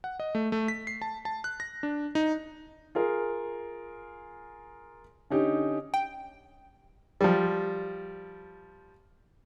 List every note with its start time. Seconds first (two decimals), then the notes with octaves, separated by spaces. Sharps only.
0.04 F#5
0.20 D#5
0.35 A3
0.52 A3
0.68 B6
0.87 C7
1.02 A5
1.25 A5
1.44 F#6
1.60 A#6
1.83 D4
2.15 D#4
2.95 F4 G#4 A#4
5.30 D3 C#4 D#4 G4
5.94 G5
7.21 F3 G3